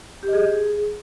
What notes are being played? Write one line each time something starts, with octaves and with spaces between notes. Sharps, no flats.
G4
D#5
G#4